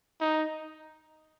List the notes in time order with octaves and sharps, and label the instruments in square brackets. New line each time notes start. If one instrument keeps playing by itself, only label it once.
[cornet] D#4